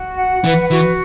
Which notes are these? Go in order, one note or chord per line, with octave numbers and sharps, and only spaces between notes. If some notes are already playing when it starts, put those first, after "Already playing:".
Already playing: F#4
F#5
E3 B4
E3 F#4